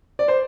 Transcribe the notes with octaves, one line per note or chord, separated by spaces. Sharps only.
D5
C5